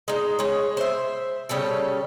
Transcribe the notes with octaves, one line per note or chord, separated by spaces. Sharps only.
G#3 D#4
G#3 C#5
C5 E5
C#3 G3 C#4 A4